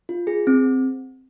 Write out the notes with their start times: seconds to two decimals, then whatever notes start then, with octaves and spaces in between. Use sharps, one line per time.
0.09 F4
0.27 G#4
0.47 C4